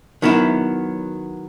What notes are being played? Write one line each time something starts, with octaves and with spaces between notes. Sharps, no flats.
D#3 F#3 B3 E4